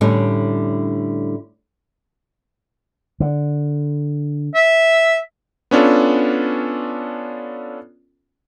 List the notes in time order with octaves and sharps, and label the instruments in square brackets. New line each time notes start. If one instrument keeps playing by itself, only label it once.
[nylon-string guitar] A2 D3 G3 C#4 D4
[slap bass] D3
[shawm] E5
[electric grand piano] B3 C#4 D4 F4 A4